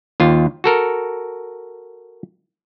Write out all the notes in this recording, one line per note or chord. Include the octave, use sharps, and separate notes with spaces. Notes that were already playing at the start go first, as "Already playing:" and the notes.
D#2 F4
F#4 A4 A#4